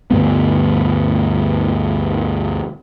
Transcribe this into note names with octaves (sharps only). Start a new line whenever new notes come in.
D2 G2 A3 B3